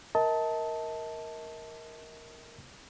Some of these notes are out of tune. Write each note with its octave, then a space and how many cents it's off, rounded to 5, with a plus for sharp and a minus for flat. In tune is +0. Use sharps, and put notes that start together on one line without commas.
A#4 +0 D#5 +40 A5 +0